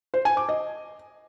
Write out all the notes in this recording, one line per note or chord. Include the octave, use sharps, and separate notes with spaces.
C5
G#5
D6
D#5